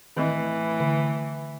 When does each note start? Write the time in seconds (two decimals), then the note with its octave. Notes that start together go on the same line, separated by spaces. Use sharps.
0.17 A2 D#3 E3 C4 D#5
0.80 D3